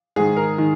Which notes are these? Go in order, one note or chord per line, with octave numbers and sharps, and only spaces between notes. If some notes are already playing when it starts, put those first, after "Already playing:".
G#2 D#3 G#4
A#4
D#3